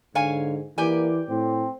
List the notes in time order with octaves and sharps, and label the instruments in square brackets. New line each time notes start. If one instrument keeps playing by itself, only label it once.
[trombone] G#2 [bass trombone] D3 [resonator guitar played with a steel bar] C#5 F5 G#5
[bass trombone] E3 [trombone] A#3 [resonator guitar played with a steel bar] G4 D5 G#5
[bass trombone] A2 [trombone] C4